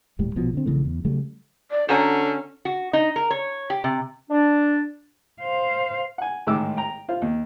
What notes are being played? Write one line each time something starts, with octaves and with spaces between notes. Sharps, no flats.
D#1 A2 G3
A#1 B2 F3
D3 C4
A#1 C#3 E3 A3
E2
C#3 F#3 G3 A3
D5
D3 C#4 F#4 G#5 A#5
F#4
D#4
A#4
C#5
G4
C3
D4
C5 F5
F#5 G#5
A1 G#2 D#3 G#3 D6 E6
G5 A#5
F4 C5 F5
D#2